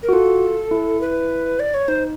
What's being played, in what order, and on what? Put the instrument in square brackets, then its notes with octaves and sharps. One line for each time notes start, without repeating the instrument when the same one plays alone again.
[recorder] A#4
[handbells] F#4
[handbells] F4 [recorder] A4
[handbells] E4
[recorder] B4
D5
C#5
[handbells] D#4 [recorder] C5